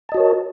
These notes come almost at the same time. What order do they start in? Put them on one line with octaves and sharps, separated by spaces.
A5 D#5 F#4 C#5 A#4